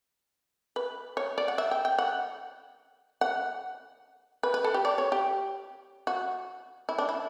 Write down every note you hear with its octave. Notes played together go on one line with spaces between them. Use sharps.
B4
C#5
D5
F#5
E5
G5
G5
F#5
F#5
B4
B4
A4
G4
D5
C#5
G4
F#4
E4
D4
E4